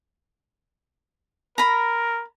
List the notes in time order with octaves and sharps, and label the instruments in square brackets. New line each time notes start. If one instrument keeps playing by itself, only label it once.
[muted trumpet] A#4 [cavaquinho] A#5 B5